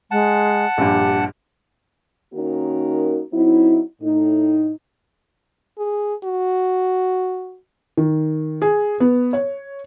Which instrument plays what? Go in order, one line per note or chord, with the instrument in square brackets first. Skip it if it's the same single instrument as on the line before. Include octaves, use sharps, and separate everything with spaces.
[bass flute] G#3 [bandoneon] F#5 A5
[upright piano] A#1 G2 [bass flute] G4
[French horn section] D#3 A#3 C#4 D#4 F#4 A#4
F#3 C4 D#4 E4
A2 D#4
[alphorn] G#4
F#4
[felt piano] D#3
G#4
B3
C#5